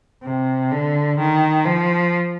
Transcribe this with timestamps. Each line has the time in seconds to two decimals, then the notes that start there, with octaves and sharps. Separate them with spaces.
0.24 C3
0.72 D3
1.19 D#3
1.65 F3